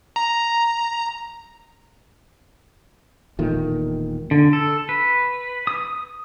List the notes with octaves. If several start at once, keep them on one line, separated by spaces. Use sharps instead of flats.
A#5
E1 A#2 D#3 A3
D3
A4
B4
D#6